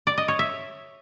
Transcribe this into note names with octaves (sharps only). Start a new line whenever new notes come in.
D5
D#5
C#5
E5